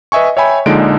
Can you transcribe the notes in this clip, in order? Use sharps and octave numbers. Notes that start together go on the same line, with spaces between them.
B4 D#5 E5 G#5 C#6
C#5 E5 G5 G#5 B5
A#1 A#2 D3 G#3 D#4 D7